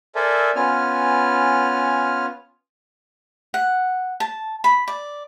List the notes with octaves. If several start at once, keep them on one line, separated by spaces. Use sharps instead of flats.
A4 A#4 C5 D5 E5 G#5
B3 C#4 F4 G#5 F6
F#5
A5
B5
D5